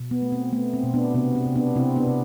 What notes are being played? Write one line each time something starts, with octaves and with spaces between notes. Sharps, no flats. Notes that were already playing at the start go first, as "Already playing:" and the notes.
Already playing: B2
B3
A3
C4
A3 B3
C4
B2
B3 D4
C3 B3
C4
C3
B3 D4
C3 C4 E4
B3 D4
C3